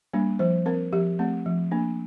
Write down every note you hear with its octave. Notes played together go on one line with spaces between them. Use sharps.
G3 A#3 D4
F3 C5
C4 A#4
F3 G4
A3 C4
F3
A#3 D4